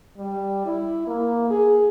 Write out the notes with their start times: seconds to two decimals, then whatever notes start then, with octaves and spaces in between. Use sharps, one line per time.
0.18 G3
0.65 E4
1.07 A#3
1.50 G#4